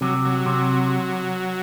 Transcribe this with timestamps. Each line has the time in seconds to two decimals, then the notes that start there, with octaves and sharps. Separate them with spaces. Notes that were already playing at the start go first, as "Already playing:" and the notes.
0.01 C3 F#3
0.25 F#3
0.46 C3